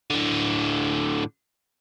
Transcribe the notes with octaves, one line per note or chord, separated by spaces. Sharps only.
A2 D3